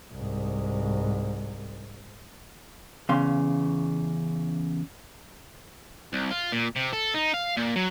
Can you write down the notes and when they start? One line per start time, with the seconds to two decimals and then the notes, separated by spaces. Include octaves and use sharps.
0.14 C2 G#2
3.09 E2 C#3 F5 C6
6.13 C2
6.31 F4
6.52 A#2
6.76 C3
6.93 A4
7.14 D#4
7.34 F5
7.57 A#2
7.76 F#3